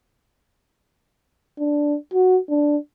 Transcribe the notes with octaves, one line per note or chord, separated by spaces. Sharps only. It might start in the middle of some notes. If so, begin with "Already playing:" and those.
D4
F#4
D4